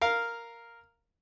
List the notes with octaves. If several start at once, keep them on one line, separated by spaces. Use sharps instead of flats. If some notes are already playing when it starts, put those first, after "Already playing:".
A#4 F5